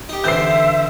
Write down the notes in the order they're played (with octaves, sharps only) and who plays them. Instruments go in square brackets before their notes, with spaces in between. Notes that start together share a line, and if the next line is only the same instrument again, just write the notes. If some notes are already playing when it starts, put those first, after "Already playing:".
[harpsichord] D#4 G4
[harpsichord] D3 E3 C4 [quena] E5 [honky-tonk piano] G6 C7